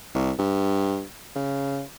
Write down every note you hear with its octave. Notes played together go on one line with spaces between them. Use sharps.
C2
G2
C#3